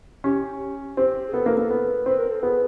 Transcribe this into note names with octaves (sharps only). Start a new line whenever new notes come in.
C#4 G4
C4 G4
G#4
B3 A4
A#3
A#3
B3
C4 B4
A#4
A4
B3 G#4